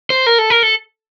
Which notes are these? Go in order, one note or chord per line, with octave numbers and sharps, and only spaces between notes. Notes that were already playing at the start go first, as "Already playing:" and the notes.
C5
A#4
A4
A#4
A4